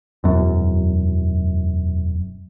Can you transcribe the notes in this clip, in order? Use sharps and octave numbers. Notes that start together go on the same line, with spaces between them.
E1 F#2